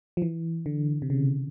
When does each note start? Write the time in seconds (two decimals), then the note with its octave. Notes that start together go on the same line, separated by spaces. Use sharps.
0.17 F3
0.22 E3
0.66 D3
1.02 C3
1.10 C#3